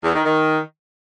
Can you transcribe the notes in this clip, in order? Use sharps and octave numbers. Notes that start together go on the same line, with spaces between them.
E2
D#3
D#3